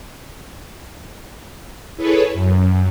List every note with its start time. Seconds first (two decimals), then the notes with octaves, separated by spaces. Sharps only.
1.96 E4 G#4 A4 B4 C#5
2.33 F#2